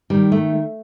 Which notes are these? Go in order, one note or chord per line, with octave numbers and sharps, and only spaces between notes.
D#3 G3
A3